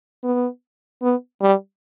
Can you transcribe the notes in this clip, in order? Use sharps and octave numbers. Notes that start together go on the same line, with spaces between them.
B3
B3
G3